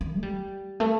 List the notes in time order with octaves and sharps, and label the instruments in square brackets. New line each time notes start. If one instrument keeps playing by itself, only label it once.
[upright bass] D#3
A3
G3
A3